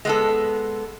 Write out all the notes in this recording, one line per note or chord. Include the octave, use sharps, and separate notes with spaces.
G#3 B3 A4